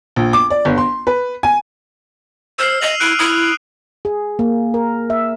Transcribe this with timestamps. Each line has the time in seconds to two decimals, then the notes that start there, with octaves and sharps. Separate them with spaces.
0.16 A#1
0.33 D6
0.50 D5
0.65 G1
0.78 C6
1.07 B4
1.43 G#5
2.59 C5 E6 F6 C7
2.81 D#5 D#7 F7 F#7
3.00 E4 F#6 D7 D#7
3.19 E4 D#6
4.05 G#4
4.39 A#3
4.74 A#4
5.10 E5